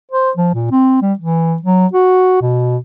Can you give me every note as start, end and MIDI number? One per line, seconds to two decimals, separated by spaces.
0.11 0.31 72
0.37 0.49 53
0.54 0.68 46
0.71 0.98 60
1.02 1.13 55
1.19 1.56 52
1.62 1.87 54
1.93 2.39 66
2.41 2.77 47